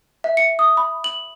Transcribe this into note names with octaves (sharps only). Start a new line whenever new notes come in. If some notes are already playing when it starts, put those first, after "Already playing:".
E5
C#7
D#6
B5
F#7